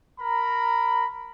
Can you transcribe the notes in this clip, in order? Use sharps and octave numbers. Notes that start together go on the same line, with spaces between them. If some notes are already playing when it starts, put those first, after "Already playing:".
A#4 A#5 B5